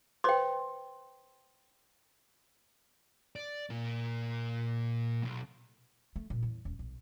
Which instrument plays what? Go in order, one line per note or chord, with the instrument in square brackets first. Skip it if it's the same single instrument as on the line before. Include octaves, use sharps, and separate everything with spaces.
[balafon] B4 C5 [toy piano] G5 C6
[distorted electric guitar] D5
A#2 A#3
B1
[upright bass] A3
A#2
E2
D#1
B1